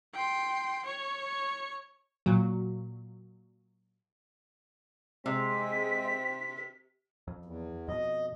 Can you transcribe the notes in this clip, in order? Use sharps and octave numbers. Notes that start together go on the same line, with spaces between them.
G5 C6
C#5 C#6
A#2 F#3
C3 G#3 C4 B6
F2
E2
F2 B2 D#5